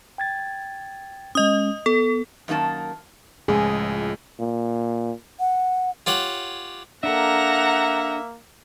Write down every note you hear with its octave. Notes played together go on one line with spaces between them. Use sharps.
G5 G#6 A6
G#3 C#4 D#5 D#6
B3 A4
F#2 D#3 A#3 F4 A5
C#2 A2 F3 G#3 G#4
A#2
F#5
F4 G4 C#5 F#5
A#3 D4 A4 E5 F#5 A#5